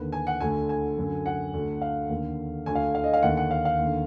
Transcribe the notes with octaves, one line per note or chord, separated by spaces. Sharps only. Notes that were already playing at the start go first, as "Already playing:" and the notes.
Already playing: D#2 D3 B4
G#5
F#5
D2 D3 G#5
G#5
F#2 D3
F#5
D2 D3
F5
D#2 D3
D2 D3 G#5
F5
F5
D#5
F5
D#2 D3 F#5
F#5
F5
F5
D#2 D3